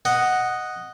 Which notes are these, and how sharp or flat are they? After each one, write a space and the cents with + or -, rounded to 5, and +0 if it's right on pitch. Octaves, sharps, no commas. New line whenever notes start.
D#5 +0 F#5 +0